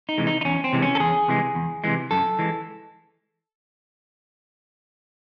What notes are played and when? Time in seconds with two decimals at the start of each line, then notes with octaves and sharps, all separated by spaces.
0.09 D#4
0.18 C3 E3 G#3
0.27 D#4
0.41 D#4
0.45 E2 C#4
0.64 C4
0.73 C3 E3 G#3
0.82 C#4
0.95 A4
1.00 E2 G#4
1.28 C3 E3 G#3
1.55 E2
1.84 C3 E3 G#3
2.11 F#2 A4
2.39 E3 G#3